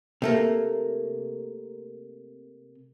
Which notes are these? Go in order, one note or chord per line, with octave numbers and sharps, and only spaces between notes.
C3 A3 A#3